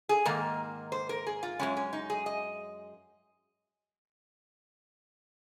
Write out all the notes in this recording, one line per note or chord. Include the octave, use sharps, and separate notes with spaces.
G#4
G#2 D#3 A#3 A#4
C5
A#4
G#4
F4
F#2 C#3 G#3 C#4
C#4
D#4
G#4
D#5